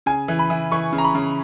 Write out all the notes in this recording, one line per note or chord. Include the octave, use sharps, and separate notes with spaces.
C#3 G#5
E3
B5
E3
E3 C#6
C#3
A#5
B5
C#3